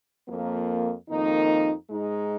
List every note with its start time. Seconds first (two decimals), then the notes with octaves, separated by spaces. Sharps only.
0.28 F2 F3 A#3
1.09 F2 D#3 A#3 D#4
1.89 G#2 G#3 D#4